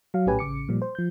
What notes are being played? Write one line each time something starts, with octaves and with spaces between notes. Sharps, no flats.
F#3 F5
A#1 A2 C#4 G4 B4 G#5
A1 C#3 D6 C#7
A#2 F3 G3
C5
F3 G6